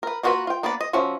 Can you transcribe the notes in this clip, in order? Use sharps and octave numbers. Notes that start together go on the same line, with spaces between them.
A#4 B4
A#3 F4 F#4 G#4 B4
F4 G5
A#3 B3 D4 B4 D5
D#5
F3 C#4 F#4 E5